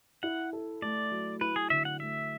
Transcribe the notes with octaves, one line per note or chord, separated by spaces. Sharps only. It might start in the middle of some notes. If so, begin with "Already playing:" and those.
E4 F#5
A4
A3 D5
F#3
E4 B4
G#4
D3 E5
F#5
A3 E5